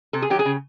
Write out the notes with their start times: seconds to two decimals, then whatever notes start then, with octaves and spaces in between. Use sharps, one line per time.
0.13 C3 A4
0.22 G#4
0.30 D#3 F#3 G4
0.39 G#4
0.45 C#3